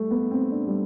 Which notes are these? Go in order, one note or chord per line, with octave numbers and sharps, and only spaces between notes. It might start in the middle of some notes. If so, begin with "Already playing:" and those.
Already playing: G3 A3
B3
C4
D4
G3